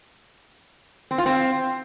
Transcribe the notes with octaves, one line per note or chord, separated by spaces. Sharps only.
C4
F4
C4